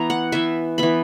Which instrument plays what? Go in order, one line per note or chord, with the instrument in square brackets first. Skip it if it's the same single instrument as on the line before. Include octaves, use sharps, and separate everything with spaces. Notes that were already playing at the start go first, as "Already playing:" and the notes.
Already playing: [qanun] E3 B3 A#5
F#5
E3 B3 E5
E3 B3 B5